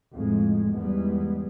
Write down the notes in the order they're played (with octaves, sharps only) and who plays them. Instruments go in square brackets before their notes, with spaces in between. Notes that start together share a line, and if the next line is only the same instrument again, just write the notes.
[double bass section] F2 A2 G#3
E2 G#2 G3 G#3 B3